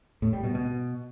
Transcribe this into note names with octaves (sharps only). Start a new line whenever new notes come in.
A2
G3
B2
B2